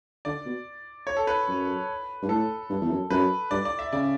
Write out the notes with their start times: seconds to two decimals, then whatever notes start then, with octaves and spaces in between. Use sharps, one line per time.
0.25 D3 D5
0.46 B2
1.07 C#5
1.17 A4
1.27 B4
1.48 F#2
2.23 G2
2.29 A2 A4
2.70 G2
2.81 E2
2.91 F#2
3.10 F#2 B4
3.51 G2 D5
3.65 D5
3.79 E5
3.93 C#3 D5